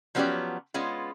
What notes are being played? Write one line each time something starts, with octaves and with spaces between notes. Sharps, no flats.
F3 F#3 B3 C#4 G4 D5
G#3 B3 C#4 F4